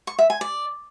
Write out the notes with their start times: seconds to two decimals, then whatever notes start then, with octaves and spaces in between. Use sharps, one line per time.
0.07 C#6
0.19 E5
0.30 G#5
0.41 D5